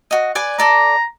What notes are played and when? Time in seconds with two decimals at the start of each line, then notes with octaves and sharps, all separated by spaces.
0.11 F#4 D#5
0.35 B4 D5 G#5
0.59 A4 D5 A#5 D6